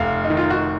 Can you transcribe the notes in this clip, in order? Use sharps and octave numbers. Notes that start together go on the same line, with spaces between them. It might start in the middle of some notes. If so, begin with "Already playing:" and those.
Already playing: F1 F5
D#4
D#3
F4
F#4